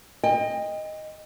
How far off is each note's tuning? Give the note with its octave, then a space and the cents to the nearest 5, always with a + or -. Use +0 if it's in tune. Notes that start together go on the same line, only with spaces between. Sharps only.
D#5 +0 G5 +35